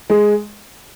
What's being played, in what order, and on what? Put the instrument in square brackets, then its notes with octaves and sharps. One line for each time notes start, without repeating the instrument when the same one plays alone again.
[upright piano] G#3